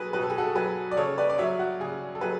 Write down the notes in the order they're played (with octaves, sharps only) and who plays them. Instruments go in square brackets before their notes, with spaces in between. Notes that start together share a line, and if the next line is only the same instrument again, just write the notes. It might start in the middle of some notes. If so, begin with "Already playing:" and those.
Already playing: [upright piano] B2 F#3 G#4 A4 B4
B2 B4
A4
G#4
F#4 A4
F#3 G#4 B4
D5
C#3 A4 C#5
B4 D5
D5
F#3 C#5 E5
F#4
C#3 G#4
A4
F#3 G#4 B4